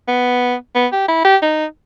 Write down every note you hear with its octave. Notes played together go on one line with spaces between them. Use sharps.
B3
B3
G4
E4
G4
D#4